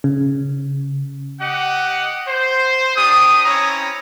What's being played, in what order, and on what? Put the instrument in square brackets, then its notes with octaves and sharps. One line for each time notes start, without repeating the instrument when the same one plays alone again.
[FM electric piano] C#3
[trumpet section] G4 D#5 F#5
C5
D4 G4 D#6
C4 C#4 E4 C#5 A#5